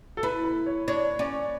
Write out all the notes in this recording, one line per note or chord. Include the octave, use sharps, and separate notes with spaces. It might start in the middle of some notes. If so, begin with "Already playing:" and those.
A4
E4 B4
B4
C#5
D4 C#5
C#4 D5